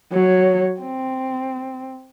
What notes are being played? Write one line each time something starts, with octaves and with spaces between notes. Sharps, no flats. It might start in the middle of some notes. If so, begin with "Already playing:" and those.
F#3 C#5
C4